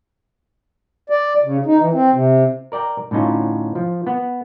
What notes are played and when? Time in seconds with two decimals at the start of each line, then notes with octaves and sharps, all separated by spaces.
1.10 D5
1.43 C#3
1.66 D#4
1.80 E3
1.93 C4
2.12 C3
2.72 A#4 D5 G5 A#5
3.11 A2 D3 C#4 D#4 F4
3.75 F3
4.07 B3